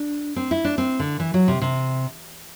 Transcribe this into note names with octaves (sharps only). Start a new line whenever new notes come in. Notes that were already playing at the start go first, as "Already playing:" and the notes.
Already playing: D4
C4
E4
D4
C4
D3
E3
F#3
C3
C3